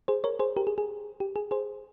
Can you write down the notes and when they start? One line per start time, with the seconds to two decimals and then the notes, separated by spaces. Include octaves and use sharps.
0.08 G#4 C5
0.24 A#4 C#5
0.39 G#4 C5
0.57 G4 A#4
0.67 G#4
0.78 G#4
1.20 G4
1.36 G#4
1.51 G#4 C5